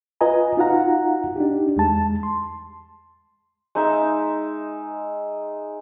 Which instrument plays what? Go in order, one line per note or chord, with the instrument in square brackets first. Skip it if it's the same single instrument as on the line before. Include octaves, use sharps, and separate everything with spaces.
[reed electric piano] F4 B4 D#5 G#5 A#5
D#4 F4 F#4 F5 F#5 A#5
D4 D#4 G4
E2 G#3 A5
C6
[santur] G#3 D#4 E5